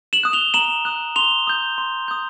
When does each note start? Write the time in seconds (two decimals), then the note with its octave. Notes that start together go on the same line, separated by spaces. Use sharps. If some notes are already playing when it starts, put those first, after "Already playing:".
0.13 E7 F#7
0.23 D#6 F#6
0.33 F7 G7
0.54 A#5 E7 F#7
0.85 D#6 F#6
1.16 C6 F7 G7
1.47 D#6 G6
1.78 C6
2.08 D#6 G6